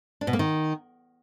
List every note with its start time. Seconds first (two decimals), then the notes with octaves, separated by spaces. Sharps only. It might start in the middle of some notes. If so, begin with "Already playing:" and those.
0.21 D4
0.27 B2
0.33 A#3
0.39 D#3